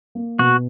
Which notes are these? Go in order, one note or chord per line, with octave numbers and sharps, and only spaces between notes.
A#3
B2 F#4